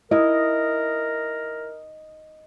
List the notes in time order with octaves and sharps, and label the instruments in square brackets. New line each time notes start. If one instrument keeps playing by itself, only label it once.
[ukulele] E4 [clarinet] A#4 [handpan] D#5